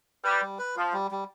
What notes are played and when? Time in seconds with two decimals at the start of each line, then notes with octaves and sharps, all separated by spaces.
0.24 G3 B4
0.42 G3
0.59 B4
0.76 F3 F4
0.93 G3
1.11 G3